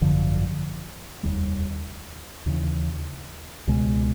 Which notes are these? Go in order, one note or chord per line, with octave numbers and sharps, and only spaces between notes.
G#1 F#2 D3 F3
F1 D#2 D#3 G3
D#2 C#3 E3
C#2 B2 G#3